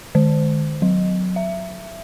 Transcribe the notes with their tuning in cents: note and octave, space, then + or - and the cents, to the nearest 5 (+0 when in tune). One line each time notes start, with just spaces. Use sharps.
D#3 -35
F#3 -10
E5 +20